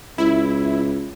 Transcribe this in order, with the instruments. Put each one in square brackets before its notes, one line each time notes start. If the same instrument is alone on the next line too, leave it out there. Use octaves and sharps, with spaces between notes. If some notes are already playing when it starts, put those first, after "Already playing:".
[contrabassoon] C#2 [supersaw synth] E4